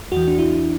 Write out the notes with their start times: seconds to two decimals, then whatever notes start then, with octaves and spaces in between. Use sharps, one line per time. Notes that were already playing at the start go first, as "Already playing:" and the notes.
0.12 E2 E3 F#4
0.27 D4
0.39 E4